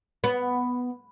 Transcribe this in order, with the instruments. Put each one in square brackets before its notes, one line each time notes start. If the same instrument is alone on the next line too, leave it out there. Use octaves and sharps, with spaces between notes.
[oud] B3